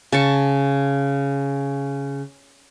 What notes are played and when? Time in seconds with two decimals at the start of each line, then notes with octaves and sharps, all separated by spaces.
0.12 C#3 A5 C#6